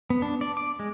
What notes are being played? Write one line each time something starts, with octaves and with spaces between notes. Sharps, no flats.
B3
D4
D5
D6
G#3